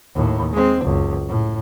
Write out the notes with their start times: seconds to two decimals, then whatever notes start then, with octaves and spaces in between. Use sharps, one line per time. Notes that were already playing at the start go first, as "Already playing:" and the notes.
0.15 D#2 A2
0.53 G#3 C4
0.82 F#1 C#2
1.28 A2